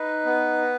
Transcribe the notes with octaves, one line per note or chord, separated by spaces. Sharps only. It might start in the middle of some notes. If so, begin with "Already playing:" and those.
Already playing: D#4 B4
B3